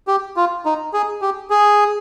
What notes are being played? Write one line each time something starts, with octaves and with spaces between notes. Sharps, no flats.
G4
F4
D#4
G#4
G4
G#4